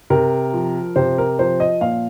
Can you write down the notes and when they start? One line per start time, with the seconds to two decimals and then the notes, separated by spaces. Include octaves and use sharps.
0.10 C3 A#4
0.53 F3
0.96 C3 C5
1.18 A#4
1.39 F3 C5
1.60 D#5
1.81 A#2 F5